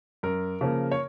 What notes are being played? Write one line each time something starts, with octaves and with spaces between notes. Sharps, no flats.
F#2 A#4
C#3 F3 A#3
C#5